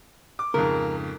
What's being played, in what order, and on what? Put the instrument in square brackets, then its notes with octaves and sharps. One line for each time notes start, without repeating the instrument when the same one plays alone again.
[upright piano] D6
[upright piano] F2 G#2 C#3 [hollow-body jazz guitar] A#4